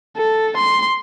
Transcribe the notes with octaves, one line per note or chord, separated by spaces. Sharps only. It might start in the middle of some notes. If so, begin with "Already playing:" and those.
A4
C6